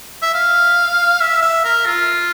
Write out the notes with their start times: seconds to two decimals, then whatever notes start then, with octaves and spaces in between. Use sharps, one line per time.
0.22 E5
0.34 F5
1.20 E5
1.42 E5
1.64 A#4
1.86 F4